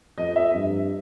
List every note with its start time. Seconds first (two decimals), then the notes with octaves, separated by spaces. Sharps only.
0.18 F2 D#5
0.36 E5
0.54 G2